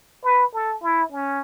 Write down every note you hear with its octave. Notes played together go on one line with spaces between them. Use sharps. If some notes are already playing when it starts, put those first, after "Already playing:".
B4
A4
E4
C#4